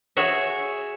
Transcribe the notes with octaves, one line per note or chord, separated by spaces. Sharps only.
F#4 G#4 C#5 E5